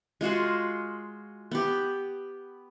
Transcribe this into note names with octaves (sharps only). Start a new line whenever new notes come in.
G#3 F4 F#4 G#4
B3 G4